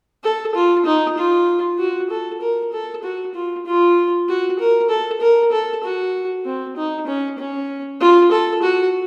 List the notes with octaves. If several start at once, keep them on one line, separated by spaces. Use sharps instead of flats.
A4
F4
D#4
F4
F#4
A4
A#4
A4
F#4
F4
F4
F#4
A#4
A4
A#4
A4
F#4
C4
D#4
C#4
C#4
F4
A4
F#4